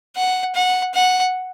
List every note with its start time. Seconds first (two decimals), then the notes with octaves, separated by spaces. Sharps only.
0.16 F#5
0.55 F#5
0.94 F#5